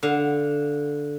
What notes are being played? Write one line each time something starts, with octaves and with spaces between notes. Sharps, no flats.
D3 F5